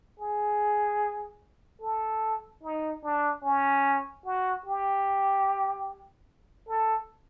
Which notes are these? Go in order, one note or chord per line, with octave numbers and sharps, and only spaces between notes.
G#4
A4
D#4
D4
C#4
F#4
G4
A4